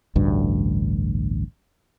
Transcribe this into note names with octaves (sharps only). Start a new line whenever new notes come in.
A1 D2 G2